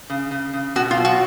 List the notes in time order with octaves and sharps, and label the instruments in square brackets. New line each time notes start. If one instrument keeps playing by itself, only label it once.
[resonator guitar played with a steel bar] C#3
C#3
C#3
[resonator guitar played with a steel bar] B2 [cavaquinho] F#4
[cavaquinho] F4
[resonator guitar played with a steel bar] F#3
[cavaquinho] F#4